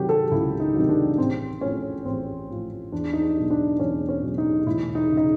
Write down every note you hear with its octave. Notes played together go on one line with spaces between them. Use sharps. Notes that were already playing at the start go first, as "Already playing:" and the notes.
Already playing: C3 D#3 F#3 F#4 G4
A4
C#2 E4
D#4
C3 D#3 F#3
D4
A1 C4
A2 F3 C#4
A1 C4
A2 F3
E2 D4
D#4
D4
B2 F#3
D4
E2 C#4
C#4
B2 F#3
D#4
E1 E4
D#4
C#3
D#4